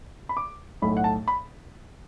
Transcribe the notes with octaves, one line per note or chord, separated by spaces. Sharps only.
B5
D6
B1 A2 A3 B5
F#5
A5
B5